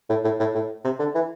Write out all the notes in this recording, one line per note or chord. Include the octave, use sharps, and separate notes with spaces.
A2
A2
A2
A2
C3
D3
E3